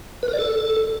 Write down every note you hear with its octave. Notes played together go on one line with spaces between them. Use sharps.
B4
A#4
D5
A4